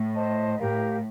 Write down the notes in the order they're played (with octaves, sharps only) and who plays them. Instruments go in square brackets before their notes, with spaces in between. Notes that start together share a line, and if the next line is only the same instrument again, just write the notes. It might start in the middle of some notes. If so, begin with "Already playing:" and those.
Already playing: [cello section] A2
[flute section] C5 D#5 A5
[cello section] A2 [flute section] G4 A#4 F5